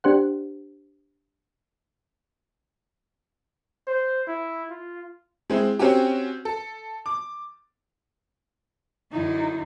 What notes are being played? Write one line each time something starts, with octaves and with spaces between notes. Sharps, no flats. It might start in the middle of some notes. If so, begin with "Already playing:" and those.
D4 G4 C5 F#5
C5
E4
F4
G#3 C4 E4
C4 C#4 F#4 G4
A4
D6
F#2 D3 D#4 E4